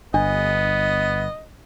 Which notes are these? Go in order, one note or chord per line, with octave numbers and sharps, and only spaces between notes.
G1 B3 D4 D#5